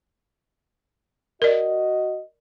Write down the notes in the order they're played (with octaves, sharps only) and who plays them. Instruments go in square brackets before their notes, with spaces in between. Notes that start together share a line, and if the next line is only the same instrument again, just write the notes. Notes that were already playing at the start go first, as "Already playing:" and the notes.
[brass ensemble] F#4 D#5 [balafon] A#4 D5